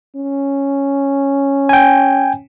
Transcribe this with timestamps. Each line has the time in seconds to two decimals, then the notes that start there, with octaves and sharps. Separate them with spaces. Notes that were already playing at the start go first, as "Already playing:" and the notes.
0.16 C#4
1.69 G5 G#5